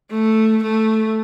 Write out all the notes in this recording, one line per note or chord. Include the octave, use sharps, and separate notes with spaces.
A3
A3